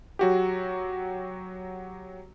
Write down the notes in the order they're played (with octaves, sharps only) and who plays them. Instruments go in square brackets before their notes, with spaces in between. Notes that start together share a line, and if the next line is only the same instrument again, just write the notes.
[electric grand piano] F#3 F#4 G4